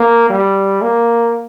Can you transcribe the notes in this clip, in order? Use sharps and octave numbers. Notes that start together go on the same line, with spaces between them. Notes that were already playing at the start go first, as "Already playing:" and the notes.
Already playing: A#3
G3
A#3